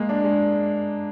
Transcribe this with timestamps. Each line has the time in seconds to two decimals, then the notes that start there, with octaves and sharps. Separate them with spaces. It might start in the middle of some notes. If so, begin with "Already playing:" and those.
Already playing: G#3 A#3
0.09 D4
0.24 G#3